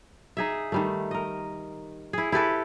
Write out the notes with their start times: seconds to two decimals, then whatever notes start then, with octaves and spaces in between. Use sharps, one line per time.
0.37 D#4 G#4 E5
0.72 D#3 G3 A3
1.11 A#4 D#5
2.13 E4 G#4
2.32 E4 G4 A4 B4